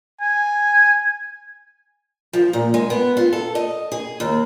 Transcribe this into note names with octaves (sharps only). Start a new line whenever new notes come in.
G#5
F3
A#2
G#3
B3
F4
A4
D#5
G#4
D#2